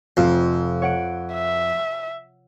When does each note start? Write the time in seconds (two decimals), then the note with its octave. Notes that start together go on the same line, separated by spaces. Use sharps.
0.17 F1 F2 F5
0.82 C#5 F#5 D7
1.33 E5